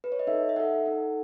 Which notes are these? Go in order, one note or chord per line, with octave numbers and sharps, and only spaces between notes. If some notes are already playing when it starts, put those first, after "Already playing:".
B4
C#5
D#5
D#4 A4 E5
E5
D#4 A4 F#5
D#4 A4